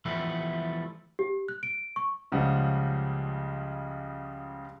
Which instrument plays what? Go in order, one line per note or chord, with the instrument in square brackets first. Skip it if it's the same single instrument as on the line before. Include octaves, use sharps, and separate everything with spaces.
[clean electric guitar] E3 F3 G3 A3 B3 E4
[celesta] G4
F#6
D7
C#6
[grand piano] C#2 C#3 F3 G3 F#5